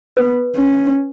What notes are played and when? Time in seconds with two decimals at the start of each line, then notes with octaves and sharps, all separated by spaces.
0.17 B3 B4
0.56 C#4